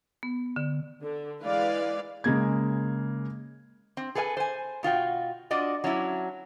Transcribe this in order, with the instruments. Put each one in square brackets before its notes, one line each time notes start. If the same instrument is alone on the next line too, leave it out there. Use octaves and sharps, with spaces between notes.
[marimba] B3
D3
[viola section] D3
E3 G#3 B4 D5 F5
[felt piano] C#3 G#3 A#3 G#6
[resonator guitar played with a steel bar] C4
G#4 A4 B4 E5 G#5
C5 G#5
B2 F4 F#4 G5
D4 F4 F#4 D5 D#5
F#3 C#4 D4 E4